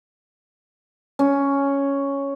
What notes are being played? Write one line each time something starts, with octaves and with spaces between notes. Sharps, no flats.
C#4